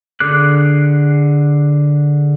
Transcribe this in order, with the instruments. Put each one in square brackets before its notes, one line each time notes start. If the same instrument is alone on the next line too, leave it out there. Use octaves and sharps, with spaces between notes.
[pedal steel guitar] D3 G#4 D6 F#6